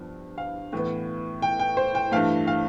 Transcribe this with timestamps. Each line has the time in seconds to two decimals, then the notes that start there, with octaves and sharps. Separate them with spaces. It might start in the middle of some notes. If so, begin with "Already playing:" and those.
Already playing: G2 F3 B3
0.38 F5
0.73 A2 E3 B3
1.42 G5
1.59 G5
1.77 C5
1.95 G5
2.11 G2 E3 A3 F5
2.47 F5